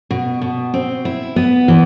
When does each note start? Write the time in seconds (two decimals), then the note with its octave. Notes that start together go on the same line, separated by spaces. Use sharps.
0.11 B2
0.42 B2
0.74 C4
1.05 E4
1.36 B3
1.68 E3